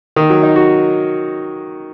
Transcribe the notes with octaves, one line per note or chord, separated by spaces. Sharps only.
D#3
F#3
D#4
F#4